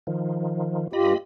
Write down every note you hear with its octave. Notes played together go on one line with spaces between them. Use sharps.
D#3 F3
G2 F4 G4 D#5 B5